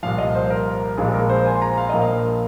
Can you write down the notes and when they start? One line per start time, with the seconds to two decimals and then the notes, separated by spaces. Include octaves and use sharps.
0.03 C2 A#2 F3 F5
0.18 D#5
0.35 C5
0.50 A#4
0.98 A#1 A#2 F3 G#3 G#4
1.14 A#4
1.29 C5
1.46 G#5
1.54 C6
1.62 A#5
1.77 F5
1.90 A#1 A#2 F3 A#3 D#5
2.01 F5